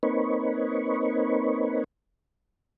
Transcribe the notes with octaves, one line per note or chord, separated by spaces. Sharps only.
A#3 C4 D#4 B4 C#5